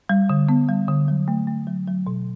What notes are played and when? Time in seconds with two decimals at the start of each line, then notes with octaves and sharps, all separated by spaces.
0.09 G3
0.29 D3
0.49 B3
0.69 G3
0.88 D3
1.08 F#3
1.28 A3
1.47 A3
1.67 F#3
1.88 F#3
2.07 B2